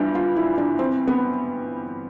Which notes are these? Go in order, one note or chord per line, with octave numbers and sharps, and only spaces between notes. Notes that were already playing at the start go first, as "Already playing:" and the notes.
Already playing: G2 E3 G3 D4 F4
F4
E4
D4
C4
B3